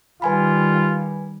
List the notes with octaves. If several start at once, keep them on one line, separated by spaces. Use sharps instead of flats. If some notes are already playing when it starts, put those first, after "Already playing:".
D#3 G3 F4 B4 G#5 B5